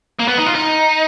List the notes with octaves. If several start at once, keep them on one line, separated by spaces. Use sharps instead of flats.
A#3
B3
D#4
F4
D#4